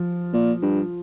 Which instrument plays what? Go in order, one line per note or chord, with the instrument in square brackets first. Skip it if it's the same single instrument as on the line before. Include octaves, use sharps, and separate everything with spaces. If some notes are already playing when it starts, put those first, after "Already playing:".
Already playing: [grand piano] F3
[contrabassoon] A#2
G2